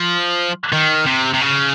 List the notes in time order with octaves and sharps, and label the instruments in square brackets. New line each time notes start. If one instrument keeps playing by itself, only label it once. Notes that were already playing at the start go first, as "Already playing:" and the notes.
Already playing: [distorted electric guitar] F3
D#3
C3
C3
C#3